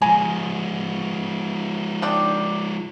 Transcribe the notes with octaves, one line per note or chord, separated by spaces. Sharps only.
F3 G#3 G#5 A#5
D#3 D4 D5